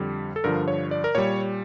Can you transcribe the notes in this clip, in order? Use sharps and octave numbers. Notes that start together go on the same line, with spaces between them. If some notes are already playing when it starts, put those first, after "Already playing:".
Already playing: F2 D3 G3
A4
G2 D3 F3 A#4
C#5
D5
A#4
A#2 G3 C#5